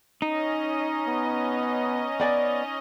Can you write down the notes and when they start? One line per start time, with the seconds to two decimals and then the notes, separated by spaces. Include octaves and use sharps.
0.22 C#4 D#4 D#5
1.08 B3
2.20 B3 D5 G#5